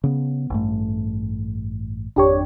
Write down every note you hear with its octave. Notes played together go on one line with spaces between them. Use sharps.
C#3 B3
A1 G2 A3
G#1 F2 D4 G4 C#5